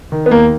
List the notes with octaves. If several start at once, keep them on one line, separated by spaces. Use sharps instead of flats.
D#3
B3
D#2 A#3